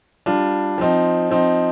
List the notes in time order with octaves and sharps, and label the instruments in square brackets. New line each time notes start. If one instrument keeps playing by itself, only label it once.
[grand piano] G3 D4 F4
F3 C4 D#4
F3 C4 D#4